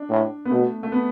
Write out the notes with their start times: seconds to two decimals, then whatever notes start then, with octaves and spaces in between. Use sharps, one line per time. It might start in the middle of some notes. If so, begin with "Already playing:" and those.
Already playing: D4
0.09 A2
0.45 B3
0.51 B2 A3
0.83 A3
0.92 B3